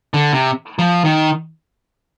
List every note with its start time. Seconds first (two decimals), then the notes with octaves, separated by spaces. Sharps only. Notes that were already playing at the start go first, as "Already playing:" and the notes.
0.14 D3
0.33 C3
0.79 F3
1.05 D#3